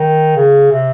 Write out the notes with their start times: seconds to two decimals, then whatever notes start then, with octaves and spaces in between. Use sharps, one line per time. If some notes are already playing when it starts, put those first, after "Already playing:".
Already playing: D#3
0.36 C#3
0.72 C3